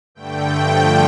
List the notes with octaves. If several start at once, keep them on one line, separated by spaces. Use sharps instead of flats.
G2 D3 A3 G5
G2 D3 F3 A3